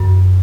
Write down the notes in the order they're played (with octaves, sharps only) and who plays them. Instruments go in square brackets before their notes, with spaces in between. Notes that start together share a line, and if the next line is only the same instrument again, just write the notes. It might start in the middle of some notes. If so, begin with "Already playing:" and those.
Already playing: [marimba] F#2